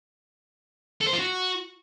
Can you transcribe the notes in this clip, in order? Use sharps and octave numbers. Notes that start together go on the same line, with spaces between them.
A4
C5
F4
F#4